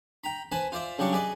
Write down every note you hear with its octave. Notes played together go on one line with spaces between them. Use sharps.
G5 A#5 B5
B4 C5 G#5 A5 B5
F4 C5 D5 E5
C#3 F#3 G3 D4 A5 C#6
G#4 B4 D5 D#5